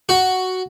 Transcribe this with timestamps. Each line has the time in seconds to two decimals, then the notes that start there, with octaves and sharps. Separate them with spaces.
0.09 F#4